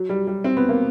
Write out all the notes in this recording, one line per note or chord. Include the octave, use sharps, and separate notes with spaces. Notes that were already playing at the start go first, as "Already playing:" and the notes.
Already playing: F#3
G3
G3
C4
B3
A#3